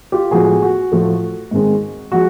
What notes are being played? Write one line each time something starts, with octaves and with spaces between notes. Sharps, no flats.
F4 G4
A2 F3 G#3 B3 F#4 G#4
F#4
A2 F3 A3
G#2 D#3 G#3 C4
F3 G#3 F#4